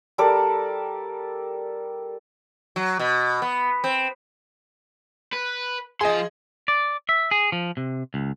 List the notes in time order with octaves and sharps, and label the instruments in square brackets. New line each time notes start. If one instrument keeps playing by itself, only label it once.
[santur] G3 A4 A#4 D5
[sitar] F#3
B2
B3
C4
[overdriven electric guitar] B4
[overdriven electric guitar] F3 C6 [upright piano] G#4 D#5
[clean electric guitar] D5
E5
G#4
F3
C3
C#2